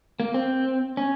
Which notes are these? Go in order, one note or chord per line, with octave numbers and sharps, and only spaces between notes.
A#3
C4
C#4